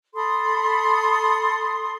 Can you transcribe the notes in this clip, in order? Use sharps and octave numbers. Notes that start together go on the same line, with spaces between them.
A4 B5 C6 D#6